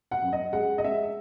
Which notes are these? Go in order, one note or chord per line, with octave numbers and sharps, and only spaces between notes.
F#5
F#2
D#5
G#3 F#5
D#5
G#3 E5